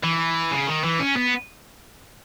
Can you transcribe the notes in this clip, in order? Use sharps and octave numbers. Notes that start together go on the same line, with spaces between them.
E3
C#3
D#3
E3
C#4
B3